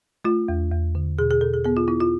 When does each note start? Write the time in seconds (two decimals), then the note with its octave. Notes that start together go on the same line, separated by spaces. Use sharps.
0.25 A3 F4
0.48 E2
0.72 E2
0.95 D3
1.18 B2 G#4
1.31 G#4
1.41 B2 A4
1.54 G#4
1.65 B3 G#4
1.77 F4
1.88 B3 E4
2.00 F4